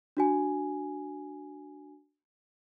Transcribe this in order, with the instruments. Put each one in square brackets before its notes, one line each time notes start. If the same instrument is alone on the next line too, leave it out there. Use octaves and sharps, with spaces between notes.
[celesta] D4 F#4 G#5